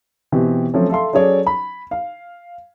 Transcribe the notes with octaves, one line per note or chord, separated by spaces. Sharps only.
B2 E3 C4 G4
F3 F#3 A3 C4 C#4
A4 E5 F5 C6
F#3 C#4 G#4 A4 C#5 D5
B5
F5